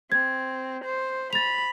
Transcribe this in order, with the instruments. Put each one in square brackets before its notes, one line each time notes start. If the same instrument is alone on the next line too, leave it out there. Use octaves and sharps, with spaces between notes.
[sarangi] C4 [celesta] G#6
[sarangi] C5
[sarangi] B5 [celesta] A6 F7